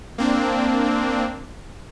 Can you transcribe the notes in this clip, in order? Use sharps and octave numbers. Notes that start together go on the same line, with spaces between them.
A#3 C4 D4